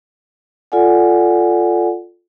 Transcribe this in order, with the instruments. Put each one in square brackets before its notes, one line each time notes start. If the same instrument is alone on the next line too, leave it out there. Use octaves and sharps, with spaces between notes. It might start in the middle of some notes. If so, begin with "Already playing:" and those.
[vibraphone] F4 A4 D5 F#5 G#5